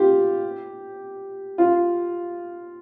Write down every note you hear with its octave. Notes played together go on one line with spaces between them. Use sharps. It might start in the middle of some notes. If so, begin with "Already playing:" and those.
Already playing: F4 G4
F4